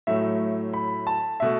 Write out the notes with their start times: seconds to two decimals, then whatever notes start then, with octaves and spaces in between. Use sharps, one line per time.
0.07 A2 F#3 A3 E5
0.73 B5
1.07 A5
1.40 B2 A3 E5